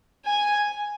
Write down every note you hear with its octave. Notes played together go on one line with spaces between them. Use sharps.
G#5